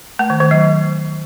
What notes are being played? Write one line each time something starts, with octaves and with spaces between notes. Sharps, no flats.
A3
D#3
D#3
F#3